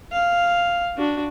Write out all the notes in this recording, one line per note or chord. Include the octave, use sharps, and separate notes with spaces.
F5
D4 F#4